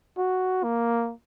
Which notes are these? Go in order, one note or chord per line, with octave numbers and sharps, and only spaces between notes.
F#4
A#3